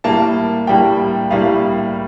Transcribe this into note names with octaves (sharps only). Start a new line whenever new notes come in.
A2 G3 A#3 A5
A2 G3 A#3 G5
A2 G3 A#3 F5